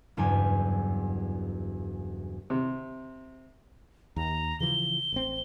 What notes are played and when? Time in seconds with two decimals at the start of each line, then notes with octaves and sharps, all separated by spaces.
0.17 F#1 E2 G2 G4 G#5
2.50 C3
4.16 D#2 A#5
4.60 C#3 E3 F3 G7
5.13 A1 C4